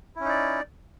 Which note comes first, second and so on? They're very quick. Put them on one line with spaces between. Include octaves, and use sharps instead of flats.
E4 C#4 D#4 D5